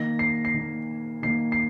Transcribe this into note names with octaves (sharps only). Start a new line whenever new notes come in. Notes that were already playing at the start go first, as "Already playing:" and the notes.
Already playing: D#3 A#3 A#6
C7
C7
D#3 A#3
D#3 A#3 C7
C7